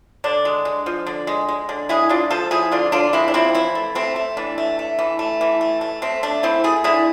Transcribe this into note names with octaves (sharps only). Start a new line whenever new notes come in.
D3 D4
G#3
G#3
F3
D3
G#3
G#3
D3
G#3 E4 G#4
G#3 D4 F4
F3 F4 A4
F3 E4 G#4
D3 D4 F4
D3 D4 F4
G#3 C4 E4
D4
F3 C4 E4
E3 C4 E4
A3
A3 C4
A3
E3 D4
A3
A3
E3
A3
E3
A3
A3
A3 C4
A3 D4
E3 C4 E4
A3 E4 G#4
D3 E4 G#4